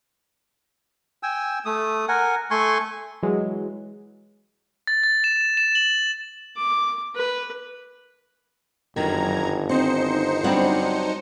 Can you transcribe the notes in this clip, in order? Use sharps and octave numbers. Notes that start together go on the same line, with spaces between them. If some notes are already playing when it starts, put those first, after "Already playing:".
G5 G#5 E6
A3 D#6
A#4 F#5 G#5
A3 G#5 C6 C#6
E3 F#3 G#3
A6
A6
E7
E7
F#7
D6
B4
G1 F#2 D#3 A#5 G#6
C4 D#4 C5 C#7
F#3 G3 B3 C4 D4 F#5